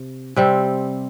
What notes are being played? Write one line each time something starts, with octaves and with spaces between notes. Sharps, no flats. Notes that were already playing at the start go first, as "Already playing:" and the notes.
Already playing: C3
C3 G3 C4